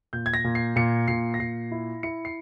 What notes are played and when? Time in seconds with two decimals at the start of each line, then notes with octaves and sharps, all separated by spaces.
0.13 A#2 G6
0.26 G#6
0.34 A#6
0.44 A#2
0.55 C7
0.76 A#2 C#7
1.08 A#2 C7
1.34 A#6
1.39 A#2 C7
1.71 E4
2.03 E4 C#7
2.25 C7